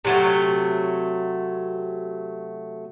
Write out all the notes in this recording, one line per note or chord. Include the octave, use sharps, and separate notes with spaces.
C3 F#3 A3